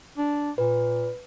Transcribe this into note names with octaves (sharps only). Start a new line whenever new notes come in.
D4
A#2 B4